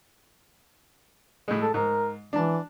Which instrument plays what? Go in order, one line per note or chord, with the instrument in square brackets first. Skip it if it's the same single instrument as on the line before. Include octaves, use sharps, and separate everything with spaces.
[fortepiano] A2 G#3
[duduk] A4
[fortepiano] G#2 [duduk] A#4
[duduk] E3 [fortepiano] D4 A5